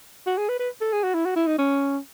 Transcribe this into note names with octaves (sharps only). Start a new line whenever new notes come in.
F#4
G#4
B4
B4
A4
G#4
F#4
E4
F#4
E4
D#4
C#4